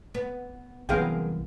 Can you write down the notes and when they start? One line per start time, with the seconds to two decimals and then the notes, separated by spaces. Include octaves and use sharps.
0.14 B3
0.89 C2 F#2 E3 B3 G#4 A#4 F5 G5